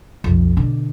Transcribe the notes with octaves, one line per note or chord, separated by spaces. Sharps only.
B1 F2
B2 D3